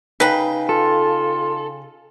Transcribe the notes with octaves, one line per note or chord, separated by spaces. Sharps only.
C#3 D#4 B4 G5
F4 A4